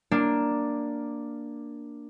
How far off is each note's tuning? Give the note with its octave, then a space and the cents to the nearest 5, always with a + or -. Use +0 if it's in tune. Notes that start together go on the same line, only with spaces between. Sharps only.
A#3 +0 D4 +0